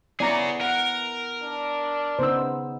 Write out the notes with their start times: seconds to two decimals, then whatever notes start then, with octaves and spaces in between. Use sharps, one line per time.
0.20 B3 E4 G#4 C#5 D5 A#5
0.61 A#4 F#5
1.43 D4
2.19 C#3 B3 D#4 C5 E6